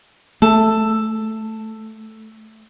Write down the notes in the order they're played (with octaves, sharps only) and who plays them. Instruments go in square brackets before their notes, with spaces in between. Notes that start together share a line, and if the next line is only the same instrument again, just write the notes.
[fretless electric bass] A3 [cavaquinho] A4